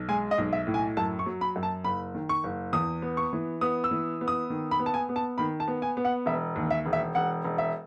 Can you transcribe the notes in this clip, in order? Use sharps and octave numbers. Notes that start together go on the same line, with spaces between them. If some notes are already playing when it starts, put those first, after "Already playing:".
Already playing: B1
G#3 G#5
D#5
B1
E5
A2
G#5
F#2 A5
C#6
F#3
B5
F#2
A5
F#1 B5
D#3
C#6
F#1
E2 D#6
B3
C#6
E3
B3 D#6
E6
E3
B3
D#6
D#3
B5
B3
A5
G#5
B3
A5
D#3 B5
A5
B3
G#5
B3
F#5
E1 E5
D#2
E5
E1
E5
E1 F#5
E1
E5